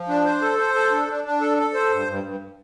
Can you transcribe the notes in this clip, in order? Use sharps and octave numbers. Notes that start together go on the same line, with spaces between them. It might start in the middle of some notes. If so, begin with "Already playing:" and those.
Already playing: F3
D4
C5
A4
C5
A4
D4
D4
D4
A4
A4
C5
G2
G2
G2